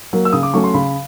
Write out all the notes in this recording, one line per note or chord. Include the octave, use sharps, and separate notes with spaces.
F#3 A#3
E6
C#3 D#6
D6
F#3 A3 C#4 C#6
C6
C#3 B5